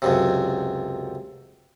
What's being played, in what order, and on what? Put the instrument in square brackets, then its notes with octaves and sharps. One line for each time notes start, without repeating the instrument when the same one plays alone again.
[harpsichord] C#2 F#2 C3